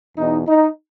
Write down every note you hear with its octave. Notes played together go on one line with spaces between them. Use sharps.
E2 B2 D#4
D#4